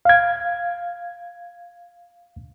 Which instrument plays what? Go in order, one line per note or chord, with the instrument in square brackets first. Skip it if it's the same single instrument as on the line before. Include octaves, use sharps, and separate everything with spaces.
[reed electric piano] F5 G#6